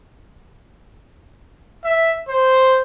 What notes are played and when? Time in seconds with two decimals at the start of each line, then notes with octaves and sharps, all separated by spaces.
1.84 E5
2.28 C5